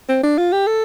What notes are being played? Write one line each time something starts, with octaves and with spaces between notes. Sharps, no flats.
C4
D4
F4
G4
A4